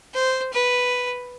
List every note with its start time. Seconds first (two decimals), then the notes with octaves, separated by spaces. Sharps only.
0.14 C5
0.53 B4